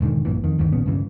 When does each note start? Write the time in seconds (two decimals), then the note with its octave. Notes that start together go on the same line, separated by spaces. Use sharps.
0.01 E1 G#2 D3 D#3
0.25 A#1 G2 A#2 E3
0.44 F2 D#3
0.58 D2 G2 D#3 E3
0.73 D#1 A#1 C#3 B3
0.86 C#2 G2 C#3 E3